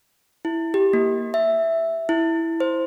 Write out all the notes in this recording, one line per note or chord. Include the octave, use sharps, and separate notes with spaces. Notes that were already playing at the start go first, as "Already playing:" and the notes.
E4
G4
A#3
E5
E4
C5